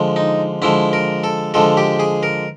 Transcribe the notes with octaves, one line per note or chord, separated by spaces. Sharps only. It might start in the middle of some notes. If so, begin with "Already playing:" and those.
Already playing: D3 F3 G#3
D#4
D3 F3 G#3 E4
A#4
A4
D3 F3 G#3 A4
G4
G#4
A#4